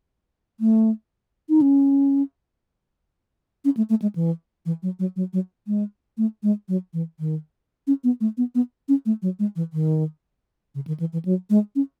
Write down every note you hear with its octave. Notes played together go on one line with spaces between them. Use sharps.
A3
D#4
C#4
C#4
A3
A3
G#3
E3
E3
F#3
F#3
F#3
F#3
G#3
A3
G#3
F#3
E3
D#3
C#4
B3
A3
B3
B3
C#4
A3
F#3
G#3
E3
D#3
C#3
D#3
E3
E3
F#3
G#3
C#4